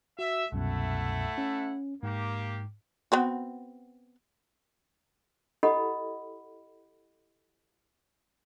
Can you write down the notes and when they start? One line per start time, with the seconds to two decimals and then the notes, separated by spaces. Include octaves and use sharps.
0.19 F#4 E5
0.52 C2 F#2 B2 A3 E4 F#5
1.38 C#4
2.03 G#2 A#3 G4
3.12 B3 C4 F#4
5.63 E4 G4 A4 D#5 F#5 B5